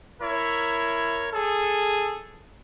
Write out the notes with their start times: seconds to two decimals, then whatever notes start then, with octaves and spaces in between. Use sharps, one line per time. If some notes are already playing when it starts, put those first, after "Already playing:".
0.22 E4 A#4 C#5
1.33 G#4 A4